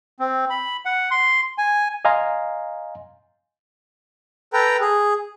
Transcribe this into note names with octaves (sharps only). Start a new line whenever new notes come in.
C4
B5
F#5
C6
G#5
D#5 F5 G#5 A#5 C6
A4 B4 G5 A#5
G#4